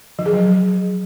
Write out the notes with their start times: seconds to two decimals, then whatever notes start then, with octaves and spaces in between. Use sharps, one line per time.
0.19 F3
0.26 G#4
0.33 F#3